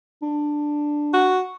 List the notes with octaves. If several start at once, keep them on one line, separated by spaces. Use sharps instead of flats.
D4
F#4